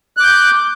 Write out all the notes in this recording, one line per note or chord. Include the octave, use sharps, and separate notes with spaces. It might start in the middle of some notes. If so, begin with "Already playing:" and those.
D6 F#6 G6